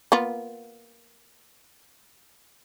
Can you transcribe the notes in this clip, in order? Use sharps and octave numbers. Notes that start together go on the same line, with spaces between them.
A#3 B3 F4